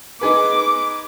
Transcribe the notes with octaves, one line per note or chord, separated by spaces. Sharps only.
D#4 G#4 B4 D6